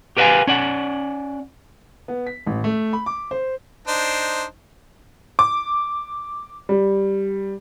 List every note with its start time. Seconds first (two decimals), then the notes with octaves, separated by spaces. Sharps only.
0.17 G4 A#4 B4 E5 F5 G#5
0.47 C#4 D5 F#5
2.08 B3
2.27 B6
2.46 A1
2.64 A3
2.93 B5
3.06 D6
3.31 C5
3.87 D4 D#4 C5
5.39 D6
6.69 G3